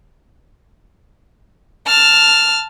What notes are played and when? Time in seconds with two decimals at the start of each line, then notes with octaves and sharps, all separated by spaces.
1.87 A5 F6